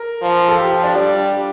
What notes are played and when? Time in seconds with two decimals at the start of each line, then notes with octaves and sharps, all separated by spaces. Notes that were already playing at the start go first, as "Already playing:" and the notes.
Already playing: A#4
0.22 F3
0.48 A4
0.59 F3 G4
0.71 F4
0.83 D4
0.95 G3